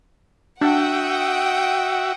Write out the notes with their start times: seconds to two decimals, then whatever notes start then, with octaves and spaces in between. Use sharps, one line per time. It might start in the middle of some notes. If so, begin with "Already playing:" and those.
0.61 D4 F#4 E5 F#5 G5 D#6